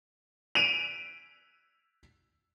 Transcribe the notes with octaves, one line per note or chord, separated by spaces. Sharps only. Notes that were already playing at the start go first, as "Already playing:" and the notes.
D7 D#7 F7